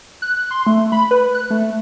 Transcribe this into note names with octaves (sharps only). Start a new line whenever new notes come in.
F#6
C6
A3
B5
B4
F#6
A3